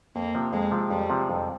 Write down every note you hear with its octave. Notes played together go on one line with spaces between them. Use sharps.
F2 A#3
C3 F3
F2 G#3
C3 F3
F2 G3
C3 F3
F2